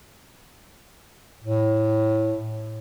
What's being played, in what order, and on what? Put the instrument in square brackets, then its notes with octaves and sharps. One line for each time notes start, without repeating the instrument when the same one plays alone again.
[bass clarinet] A2